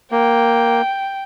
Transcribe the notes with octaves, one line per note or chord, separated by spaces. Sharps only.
A#3 G5